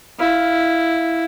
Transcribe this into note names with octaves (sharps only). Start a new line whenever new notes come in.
E4 F5